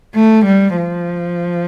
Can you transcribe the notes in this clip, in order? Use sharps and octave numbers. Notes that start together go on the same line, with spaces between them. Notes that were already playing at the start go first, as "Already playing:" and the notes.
A3
G3
F3